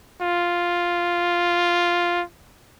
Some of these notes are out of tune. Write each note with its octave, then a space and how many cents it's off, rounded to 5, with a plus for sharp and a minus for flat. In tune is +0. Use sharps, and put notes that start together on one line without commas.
F4 +0